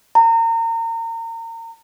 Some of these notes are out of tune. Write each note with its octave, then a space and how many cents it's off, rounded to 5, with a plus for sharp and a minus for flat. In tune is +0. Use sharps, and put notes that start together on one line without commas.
A#5 -30